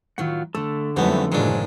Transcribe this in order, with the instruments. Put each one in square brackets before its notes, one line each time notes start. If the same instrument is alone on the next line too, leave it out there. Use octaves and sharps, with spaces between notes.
[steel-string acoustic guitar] A2 D#3 F#3 [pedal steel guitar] F4 F#5
[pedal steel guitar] D3 A4 [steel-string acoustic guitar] A3
[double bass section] F2 F#3 A3 [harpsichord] G#2 B3 [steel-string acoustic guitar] G3 F#4 B4
[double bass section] F#1 A2 F3 [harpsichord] D#3 D4 [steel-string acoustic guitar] F#3 G#3